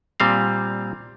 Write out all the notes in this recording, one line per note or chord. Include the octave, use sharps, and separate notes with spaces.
A#2 G3 C4 F5